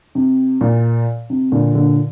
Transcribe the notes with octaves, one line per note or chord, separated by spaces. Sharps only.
C3
A#2
C3
A#2 D3
A#2 D3